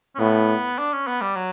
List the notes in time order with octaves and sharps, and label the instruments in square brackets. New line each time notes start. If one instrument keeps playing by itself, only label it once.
[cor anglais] C#4
[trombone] A2 [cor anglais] B3
[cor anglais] D4
C#4
B3
G3
F#3